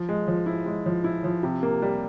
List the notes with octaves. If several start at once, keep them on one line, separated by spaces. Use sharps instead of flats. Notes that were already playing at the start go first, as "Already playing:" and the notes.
Already playing: F3
G#3
F3
E4
G#3
F3
E4
F3
C3
A#3
G3